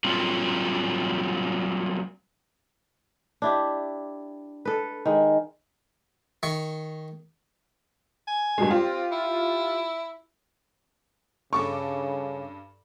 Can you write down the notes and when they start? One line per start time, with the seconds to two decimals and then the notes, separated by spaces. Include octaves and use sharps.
0.04 F#3 G3 A#3 C4 F4
3.42 D4 E4 G4
4.65 A4 B4
5.06 D#3 G#3
6.43 D#3 C#6
8.28 G#5
8.58 G2 B2 G#3
8.70 C4 F4 G4
9.12 E4
11.53 G2 C#3 A4 C#6 D6